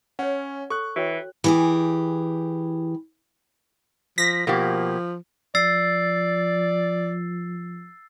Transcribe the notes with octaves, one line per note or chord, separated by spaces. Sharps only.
C#4 C#5 F#5
A4 C#6 F#6
E3 F#4 C#5 G5
E3 G4 G#4
F3 A#6 B6
B2 F3 A#3 G4
F3 D5 E6 A6 C7